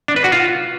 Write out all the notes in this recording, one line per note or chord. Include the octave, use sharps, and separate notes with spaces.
D4
B4
F#4
F4